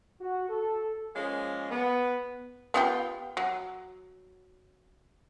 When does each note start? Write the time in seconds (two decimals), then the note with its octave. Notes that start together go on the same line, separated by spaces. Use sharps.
0.21 F#4
0.49 A4
1.15 F3 G#3 A#3 C#4 C#5 D#5
1.71 B3
2.74 B3 F4 G4
3.37 F#3